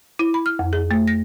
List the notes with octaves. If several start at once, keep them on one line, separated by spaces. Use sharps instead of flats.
E4
B5
F6
F2
G#4
A3
A#6